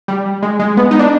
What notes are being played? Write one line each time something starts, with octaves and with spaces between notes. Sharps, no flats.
G3
G#3
G#3
B3
D#4
D4